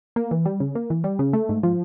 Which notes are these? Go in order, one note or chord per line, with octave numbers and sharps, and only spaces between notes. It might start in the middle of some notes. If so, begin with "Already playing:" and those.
A#3
E3
G3
C#3
A#3
E3
G3
C#3
A3
G#2
F3